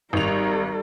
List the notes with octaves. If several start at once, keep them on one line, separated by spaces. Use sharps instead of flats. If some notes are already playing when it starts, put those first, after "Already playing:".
G#1 G3 A#4 F7